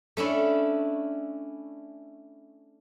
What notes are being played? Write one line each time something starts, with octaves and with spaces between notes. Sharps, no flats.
A3 C#4 D4 E4